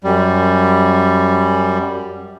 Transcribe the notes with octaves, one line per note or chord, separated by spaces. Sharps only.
F#2 G3